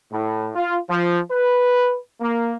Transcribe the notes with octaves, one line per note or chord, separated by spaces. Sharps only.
A2
F4
F3
B4
A#3